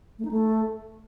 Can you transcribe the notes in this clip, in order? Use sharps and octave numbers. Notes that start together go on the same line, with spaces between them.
A3
D#4
A3